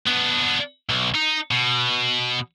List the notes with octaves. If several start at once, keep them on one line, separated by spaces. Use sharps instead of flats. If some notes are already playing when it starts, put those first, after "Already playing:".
B3 D4
B1
D#4
B2